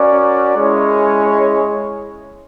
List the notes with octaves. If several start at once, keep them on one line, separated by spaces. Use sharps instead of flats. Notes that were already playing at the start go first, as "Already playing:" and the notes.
Already playing: C#4 F#4 A#4 D5
G#3 C#4 E4 G#4 C#5